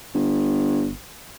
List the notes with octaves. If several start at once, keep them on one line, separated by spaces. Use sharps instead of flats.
G1